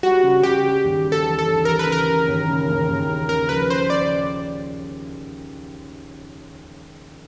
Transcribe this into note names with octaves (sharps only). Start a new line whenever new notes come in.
G3 F#4
C#3
C#3 G4
G3
D#2
G3
A4
E3
A4
D#2
E3 A#4
B4
C#3
A#4
C#3
D#2
C#3
D#2
D#2
C#3
C#3 A#4
F3 B4
C#4 C5
C#3 D5